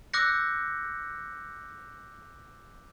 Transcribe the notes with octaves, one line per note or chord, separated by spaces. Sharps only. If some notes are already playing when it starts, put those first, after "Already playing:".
D6 E6 F#6 G6 A#6 C#7